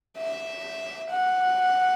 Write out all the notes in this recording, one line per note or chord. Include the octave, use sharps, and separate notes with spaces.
E5
F#5